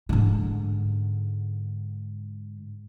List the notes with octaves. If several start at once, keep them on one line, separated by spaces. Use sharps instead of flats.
G#2 D3